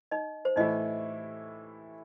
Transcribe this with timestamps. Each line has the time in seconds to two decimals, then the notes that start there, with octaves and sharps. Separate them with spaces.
0.11 D#4 D#5
0.45 C5
0.56 A2 E3 A3 D#4 E4 D#5